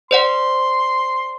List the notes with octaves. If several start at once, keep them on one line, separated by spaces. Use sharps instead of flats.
C5 D5 F#5 C6